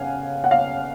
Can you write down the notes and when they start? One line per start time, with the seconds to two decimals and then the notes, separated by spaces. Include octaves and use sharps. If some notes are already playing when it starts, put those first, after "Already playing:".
Already playing: C#3 F5 F#5 G#5
0.44 F#5
0.51 F5